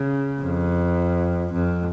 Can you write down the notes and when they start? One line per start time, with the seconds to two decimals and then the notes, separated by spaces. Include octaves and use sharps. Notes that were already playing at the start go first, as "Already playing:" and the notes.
Already playing: C#3
0.40 F2
1.53 F2